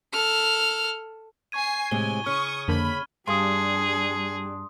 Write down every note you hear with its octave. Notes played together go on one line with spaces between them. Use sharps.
A4 F6
G#5 C#6 G#6 C7 D#7
A2 C3 G#3 G#5 G7
C#3 C#4 C#6 D#6 F6
F2 D3 A#3 B5
G2 G3 D4 G#4 C6 D#6